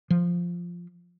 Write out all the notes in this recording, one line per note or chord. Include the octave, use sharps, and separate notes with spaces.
F3